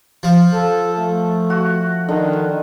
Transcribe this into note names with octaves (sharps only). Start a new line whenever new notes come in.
F3
A4
A3
F#4
D3 D#3